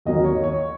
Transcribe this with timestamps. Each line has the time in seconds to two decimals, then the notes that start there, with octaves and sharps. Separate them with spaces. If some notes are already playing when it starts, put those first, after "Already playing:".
0.05 D#2 D#3 F#3 A#3 D#5
0.24 C#5
0.44 C#5